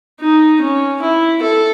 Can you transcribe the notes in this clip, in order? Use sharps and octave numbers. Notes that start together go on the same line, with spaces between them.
D#4
C#4
E4
A4